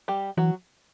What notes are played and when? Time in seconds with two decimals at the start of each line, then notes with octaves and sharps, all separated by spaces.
0.08 G3 G4
0.37 E3 F#3 F#4